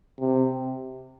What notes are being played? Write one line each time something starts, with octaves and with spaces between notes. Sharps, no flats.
C3